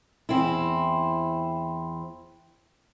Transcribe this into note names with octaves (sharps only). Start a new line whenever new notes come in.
E2 C4 E4